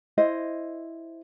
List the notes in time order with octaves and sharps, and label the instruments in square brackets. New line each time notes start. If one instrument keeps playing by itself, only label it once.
[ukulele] E4 C5 D#5